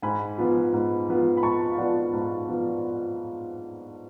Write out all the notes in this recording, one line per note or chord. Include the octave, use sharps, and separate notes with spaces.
G#2 G#5 B5
F3 B3 F4
G#2
F3 B3 F4
B5
G#2 A5 C#6
F5
F3 B3 F4 D5 F#5
G#2
F3 B3 F4